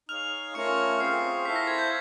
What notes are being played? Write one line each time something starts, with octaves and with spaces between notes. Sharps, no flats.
D#4 G#4 C#5 F5 F6 F7
A3 C#4 F4 A#4 C#5 C#6 C#7
C4 F4 G#4 C7
E4 A4 C5 F5 B6
A#6
G#6
G6